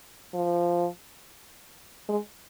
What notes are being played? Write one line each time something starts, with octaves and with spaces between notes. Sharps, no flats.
F3
G#3